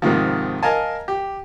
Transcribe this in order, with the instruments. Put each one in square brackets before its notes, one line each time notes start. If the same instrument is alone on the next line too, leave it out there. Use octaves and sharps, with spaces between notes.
[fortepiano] G#2 C3 D#3 F3
A#4 D#5 F5 G#5 A5
G4